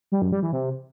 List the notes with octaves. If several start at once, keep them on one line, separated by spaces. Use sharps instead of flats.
G3
F#2
G3
E3
C3